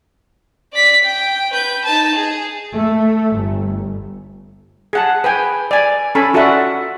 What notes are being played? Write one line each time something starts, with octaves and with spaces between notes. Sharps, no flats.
D5 B6
G5
B4 G6
D#4 A5
G#4
A3
G1
G#4 F#5 A5
B4 G5 G#5
D5 G#5
C#4 A4 G#5 B5
F4 F#4 A4 D5 E5 F#5